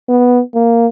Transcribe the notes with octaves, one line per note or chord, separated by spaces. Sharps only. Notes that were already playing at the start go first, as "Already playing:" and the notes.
B3
A#3